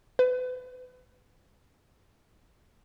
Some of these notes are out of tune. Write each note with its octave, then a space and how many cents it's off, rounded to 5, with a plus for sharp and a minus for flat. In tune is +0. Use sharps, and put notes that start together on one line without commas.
B4 +35